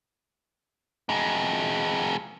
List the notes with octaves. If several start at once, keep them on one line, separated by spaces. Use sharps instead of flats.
F2 G#3